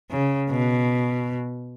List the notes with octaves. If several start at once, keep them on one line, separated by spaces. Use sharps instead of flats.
C#3
B2